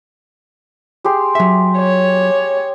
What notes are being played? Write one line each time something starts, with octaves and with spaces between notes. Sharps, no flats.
G4 G#4 C6
F#3 E5
C#5